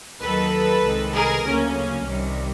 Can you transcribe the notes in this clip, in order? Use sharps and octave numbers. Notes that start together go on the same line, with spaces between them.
D#2 D#3 F#3 A4 B4
C2 C3 D#3 G#3
G#4 A#4
D2 C#3 F#3 A#3 C#4
C2 C3 D#3 G3